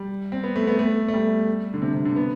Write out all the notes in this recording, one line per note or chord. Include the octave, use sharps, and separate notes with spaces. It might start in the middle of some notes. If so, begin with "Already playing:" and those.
Already playing: G3
C4
B3
A3
B3
A3
A3
G3
D3
C3
C3
D3
B3